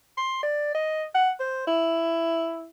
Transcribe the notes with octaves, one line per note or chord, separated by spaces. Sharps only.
C6
D5
D#5
F#5
C5
E4